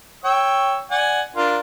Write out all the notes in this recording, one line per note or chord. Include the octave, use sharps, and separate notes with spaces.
C#5 G5 E6
D5 F#5 G#5
D4 F4 A#4